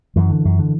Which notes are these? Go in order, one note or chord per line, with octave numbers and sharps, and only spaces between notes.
F#2 E3
D3
F#2
D3